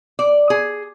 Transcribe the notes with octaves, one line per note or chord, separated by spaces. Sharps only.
D5
G#4